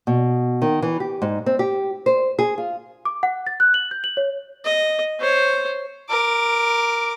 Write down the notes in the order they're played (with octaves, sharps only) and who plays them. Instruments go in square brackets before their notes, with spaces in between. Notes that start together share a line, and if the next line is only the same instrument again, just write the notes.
[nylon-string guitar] B2
D#3
E3
G4
G#2
C4
G4
C5
G#4
F4
[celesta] D6
F#5
A6
F#6
F#7
G6
F#7
C#5
[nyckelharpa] D#5
C5 C#5
[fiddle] A#4 D6